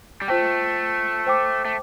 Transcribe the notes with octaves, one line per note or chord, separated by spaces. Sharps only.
G3
A3 F4 C5 G5
C5 G5 D6
A3